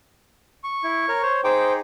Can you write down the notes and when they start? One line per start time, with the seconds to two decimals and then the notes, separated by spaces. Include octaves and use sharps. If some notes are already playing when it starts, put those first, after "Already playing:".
0.64 C#6
0.83 E4
1.08 A#4 C#5
1.23 C5 C#5
1.44 D#4 G#4 C5 G5 D6